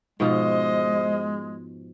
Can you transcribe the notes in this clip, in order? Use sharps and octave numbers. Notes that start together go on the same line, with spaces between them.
G#2 B2 F3 G#3 C5 D#5